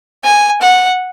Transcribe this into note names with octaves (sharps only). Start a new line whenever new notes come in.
G#5
F#5